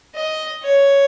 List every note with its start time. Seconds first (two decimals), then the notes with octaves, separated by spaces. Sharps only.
0.15 D#5
0.63 C#5